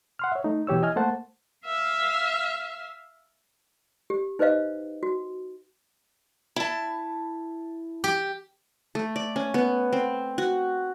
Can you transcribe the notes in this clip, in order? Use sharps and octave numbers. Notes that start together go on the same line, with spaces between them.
F#5 C6 F6
C#5 E5
A3 D#4
B2 E3 G4 C#5 E6
E4 D#5 G#5 F6
A3 A#3 C5 F#5 A5
E5 F5
G4
D#4 B4 C5 D#5 F5
F#4
E4 A5
G4
A3
D5
C#4
B3
C4
F#4